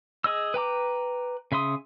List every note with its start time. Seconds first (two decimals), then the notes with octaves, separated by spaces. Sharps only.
0.24 G#4 D#5 E6
0.54 B4 G5 A#5 D6
1.52 C#3 E5 C6 D#6